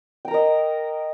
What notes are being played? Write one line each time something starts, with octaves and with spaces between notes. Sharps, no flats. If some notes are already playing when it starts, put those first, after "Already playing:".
A#4 D#5 G5 A#5